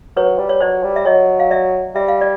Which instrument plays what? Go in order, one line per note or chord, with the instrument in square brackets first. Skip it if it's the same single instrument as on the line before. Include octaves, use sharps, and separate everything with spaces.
[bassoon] F#3 [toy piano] B4 C#5
[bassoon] G3
[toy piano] C#5
[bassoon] F#3 [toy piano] C5 D5
[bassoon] G3
[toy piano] E5
[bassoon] F#3 [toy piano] C#5 D#5
[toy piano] F5
D5 E5
[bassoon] G3 [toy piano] E5
[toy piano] F5
D5